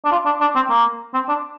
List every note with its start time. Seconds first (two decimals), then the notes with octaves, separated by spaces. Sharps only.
0.05 D4
0.12 F4
0.26 D4
0.41 D4
0.55 C4
0.70 A#3
1.14 C4
1.28 D4